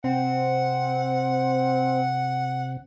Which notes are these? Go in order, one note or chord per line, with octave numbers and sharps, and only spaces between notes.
C3 C4 F#5